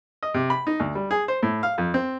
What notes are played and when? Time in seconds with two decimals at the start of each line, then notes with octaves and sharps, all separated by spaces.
0.23 D#5
0.34 C3
0.50 B5
0.67 D#4
0.80 D2
0.95 G3
1.11 G#4
1.28 C5
1.43 A2
1.63 F5
1.78 F2
1.94 C4